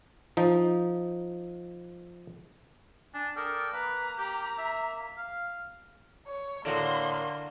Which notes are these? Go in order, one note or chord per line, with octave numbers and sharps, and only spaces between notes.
F3 D#4
D4 G#5
A4 A#4 D5 G5 D#6
A#3 B4 A#5
G4
E5
F5
C#5
A2 D3 A#3 F#4 C6